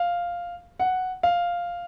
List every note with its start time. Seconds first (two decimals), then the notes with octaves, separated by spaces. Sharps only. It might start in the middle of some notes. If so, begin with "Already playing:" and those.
Already playing: F5
0.80 F#5
1.23 F5